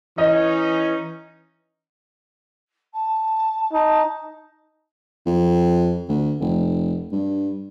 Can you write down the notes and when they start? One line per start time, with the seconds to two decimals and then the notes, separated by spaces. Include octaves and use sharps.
0.18 E3 C#4 D#4 D#5
2.93 A5
3.73 D#4 A5
5.26 F2
6.08 D2
6.41 F1
7.12 G2